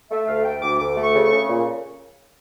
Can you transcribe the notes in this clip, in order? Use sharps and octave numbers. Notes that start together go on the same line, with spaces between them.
A3 E5
D2 F5
A3 G5
D2 D6
D2 D6
A3
C#6
C#3
C#3 C#6
A#2